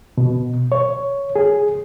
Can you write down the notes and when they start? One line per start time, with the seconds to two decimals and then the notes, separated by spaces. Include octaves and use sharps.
0.18 B2
0.72 C#5
1.36 G#4